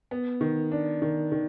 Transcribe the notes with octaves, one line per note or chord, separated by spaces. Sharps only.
B3
D#3
D4
D#3
D#3